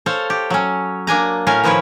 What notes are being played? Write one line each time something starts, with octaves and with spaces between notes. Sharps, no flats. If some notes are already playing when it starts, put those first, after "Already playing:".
A4 C5 C#5 F5
G4
F#3 C#4
A#3 D4 G#5 A#5
A2 C#4 A#4 F5 G#5
D#3 F3 E4 B4 C#5